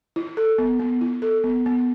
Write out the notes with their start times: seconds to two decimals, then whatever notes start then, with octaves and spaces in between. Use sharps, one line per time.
0.16 E4
0.37 A4
0.58 B3
0.79 B3
1.01 E4
1.22 A4
1.44 B3
1.66 B3